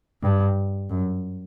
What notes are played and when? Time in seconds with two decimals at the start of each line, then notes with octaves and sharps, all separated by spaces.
0.22 G2
0.90 F#2